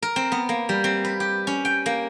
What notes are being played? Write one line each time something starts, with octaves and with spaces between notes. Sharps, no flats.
A#4
C4
B3
A#3
G3
C4
B4
G4
C#4
G5
A#3